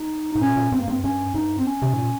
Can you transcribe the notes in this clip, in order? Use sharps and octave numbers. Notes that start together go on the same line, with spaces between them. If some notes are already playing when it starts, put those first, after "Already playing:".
Already playing: D#4
G#2 D#4
A#2 C#4
A#2
G2 C4
A#3
G2 C4
G2 C#4
G2 D#4
C4
C#4
C3
G#2
A#2